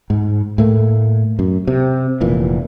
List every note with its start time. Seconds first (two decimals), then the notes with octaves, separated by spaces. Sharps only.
0.10 G#2
0.58 A2 A3 A#3
1.39 F#2
1.67 C3
2.21 F1 A#2 E3